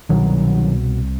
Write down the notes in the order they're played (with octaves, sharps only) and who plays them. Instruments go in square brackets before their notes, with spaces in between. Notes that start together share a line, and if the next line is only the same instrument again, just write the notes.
[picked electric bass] C2 B2 D#3 F#3